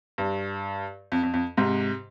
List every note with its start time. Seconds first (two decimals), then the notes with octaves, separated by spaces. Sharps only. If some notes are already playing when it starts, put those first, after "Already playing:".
0.18 G2
1.12 F2
1.23 F2
1.34 F2
1.57 G#2 C3